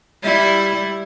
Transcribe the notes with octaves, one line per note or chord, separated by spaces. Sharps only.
G3 E4